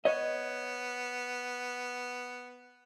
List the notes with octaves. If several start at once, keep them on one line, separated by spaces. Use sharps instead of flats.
B3 C#5 D#5